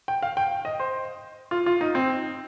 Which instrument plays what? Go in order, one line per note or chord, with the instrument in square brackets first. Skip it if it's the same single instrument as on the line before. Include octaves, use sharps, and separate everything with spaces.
[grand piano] G5
F5
G5
D#5
C5
F4
F4
D#4
C4